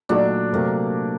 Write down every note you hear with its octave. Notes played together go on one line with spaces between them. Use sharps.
A#2 F#3 A3 D4 D#4 F#4
C3 F#3 A3 A#3